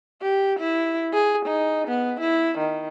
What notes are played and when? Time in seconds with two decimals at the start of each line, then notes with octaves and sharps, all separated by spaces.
0.22 G4
0.60 E4
1.13 G#4
1.46 D#4
1.87 B3
2.21 E4
2.59 D#3